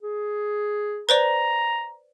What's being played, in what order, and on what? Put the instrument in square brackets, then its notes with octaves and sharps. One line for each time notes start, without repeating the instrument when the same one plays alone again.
[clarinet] G#4
[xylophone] B4 C5 D5 [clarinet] A#5